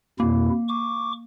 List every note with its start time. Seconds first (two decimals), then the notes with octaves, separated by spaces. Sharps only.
0.20 F2 B2 A#3 E4
0.68 C#6 D6